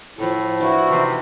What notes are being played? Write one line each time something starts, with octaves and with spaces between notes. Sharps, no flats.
A2 F3 E4 A4
D4 E4 F#4 A#4 B4
C3 E3 C4 D#4